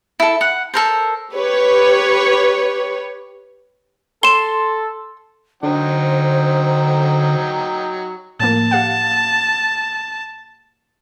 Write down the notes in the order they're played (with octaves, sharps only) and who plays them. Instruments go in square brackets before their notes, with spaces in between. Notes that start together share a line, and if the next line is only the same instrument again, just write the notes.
[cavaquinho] E4 A4
F#5
A4 A#4 C5
[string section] G4 B4 C#5
[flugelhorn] A4 [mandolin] C6 [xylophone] E7 G7
[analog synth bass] D3 [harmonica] F#3 D#4 G5 [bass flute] C5
[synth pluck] A2 F3 A#3 [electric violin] A5
[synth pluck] G4 F5 F#5